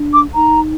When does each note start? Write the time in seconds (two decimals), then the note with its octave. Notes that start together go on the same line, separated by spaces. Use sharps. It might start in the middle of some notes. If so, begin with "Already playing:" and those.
Already playing: D4
0.13 D6
0.34 D#4 A#5